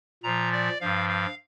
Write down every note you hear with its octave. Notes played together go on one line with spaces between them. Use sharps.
A#2 F3 A#5
D5
G2 F3 F5
F5